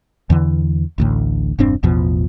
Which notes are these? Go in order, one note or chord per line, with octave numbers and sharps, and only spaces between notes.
E2 D3 E3
A1 D2 A2
E1 G2 C4 D4
A1 E2 B2 F3